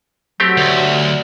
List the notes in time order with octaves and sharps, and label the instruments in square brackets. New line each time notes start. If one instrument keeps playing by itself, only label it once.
[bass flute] F#3 [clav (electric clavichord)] A3 C4 G4
[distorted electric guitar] D2